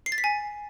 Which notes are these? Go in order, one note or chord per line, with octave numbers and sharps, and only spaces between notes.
C7
A6
B6
G#5